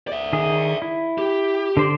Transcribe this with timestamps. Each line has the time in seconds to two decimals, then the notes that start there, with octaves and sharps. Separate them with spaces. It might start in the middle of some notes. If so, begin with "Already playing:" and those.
0.07 D5 E5
0.33 D#3 G#4
0.82 E4
1.18 G4
1.77 D3 C5 D5